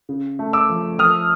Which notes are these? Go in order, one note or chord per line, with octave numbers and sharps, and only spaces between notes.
C#3
A3
D6 E6
F3
F3 D#6 F6